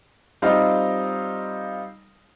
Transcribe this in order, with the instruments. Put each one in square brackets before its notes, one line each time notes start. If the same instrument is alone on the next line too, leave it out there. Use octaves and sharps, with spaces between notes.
[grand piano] G3 C4 D#4 F4 D#5 F5